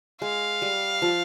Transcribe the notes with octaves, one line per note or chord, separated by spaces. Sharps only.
G#3 F5
G3
F3